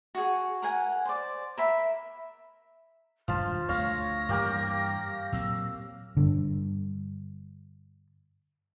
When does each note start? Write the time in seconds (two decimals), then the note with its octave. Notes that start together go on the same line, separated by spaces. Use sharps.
0.15 F#4 G#4
0.62 A#4 F#5 G#5
1.05 C5 D5
1.57 A#4 E5 B5
3.28 E1 G2 D#3 F3 A5 F6
3.69 D2 G#3 A3 C#5 F5 A#6
4.29 G2 E3 G3 A#3 G4 A#4
5.33 A#2 F#3 C4 E6
6.17 G2 D3